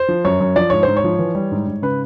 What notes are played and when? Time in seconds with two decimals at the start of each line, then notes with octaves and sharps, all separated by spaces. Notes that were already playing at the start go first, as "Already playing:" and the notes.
Already playing: C5
0.08 F3
0.25 F#2 C#5
0.40 F#2
0.56 F3 D5
0.70 G#2 C#5
0.83 G#2 C5
0.97 C#5
1.04 F3
1.19 E3
1.35 G3
1.52 G#2
1.67 G#2
1.82 C#3 B4